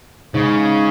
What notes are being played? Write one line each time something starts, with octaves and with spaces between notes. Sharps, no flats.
G#2 C#3